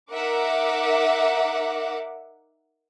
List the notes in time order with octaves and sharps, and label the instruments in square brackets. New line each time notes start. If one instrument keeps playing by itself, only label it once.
[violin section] D#4 A#4 E5 F#5 D6